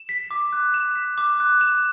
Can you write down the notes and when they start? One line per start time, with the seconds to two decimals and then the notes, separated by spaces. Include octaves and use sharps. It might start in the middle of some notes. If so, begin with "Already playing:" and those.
Already playing: E7
0.09 B6
0.31 D6
0.53 F#6
0.74 E7
0.96 B6
1.18 D6
1.40 F#6
1.61 E7